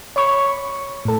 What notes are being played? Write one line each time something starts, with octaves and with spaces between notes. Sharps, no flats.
C#5 B5 C#6
A2 A4